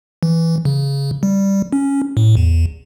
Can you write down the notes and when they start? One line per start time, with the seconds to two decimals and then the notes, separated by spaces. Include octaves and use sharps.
0.23 E3
0.65 C#3
1.23 G3
1.73 C#4
2.17 A2
2.37 E2